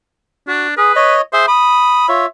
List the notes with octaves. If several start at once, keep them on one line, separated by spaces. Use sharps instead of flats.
D4 F#4
G#4 B4
C#5 D#5
G#4 C5 E5
B5 D#6
F4 C#5 E5